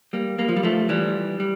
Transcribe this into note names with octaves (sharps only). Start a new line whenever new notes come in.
G3 A#3
G3 A#3
F3
G3
F3 A3
E3 G3
G3